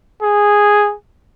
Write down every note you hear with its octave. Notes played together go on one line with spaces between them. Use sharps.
G#4